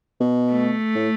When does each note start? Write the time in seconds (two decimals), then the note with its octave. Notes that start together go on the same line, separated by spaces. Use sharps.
0.20 B2
0.51 A3
0.95 A2